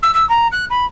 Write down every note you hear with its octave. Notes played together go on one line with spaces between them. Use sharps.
E6
E6
A#5
F#6
B5